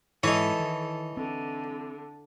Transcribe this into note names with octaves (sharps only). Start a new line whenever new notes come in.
G#2 E3 D#4 A4 C#5
D#3
D3 C4